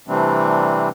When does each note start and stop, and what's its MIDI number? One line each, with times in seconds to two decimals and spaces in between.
0.08 0.89 48
0.08 0.89 52
0.08 0.89 55
0.08 0.89 57
0.08 0.89 60
0.08 0.89 62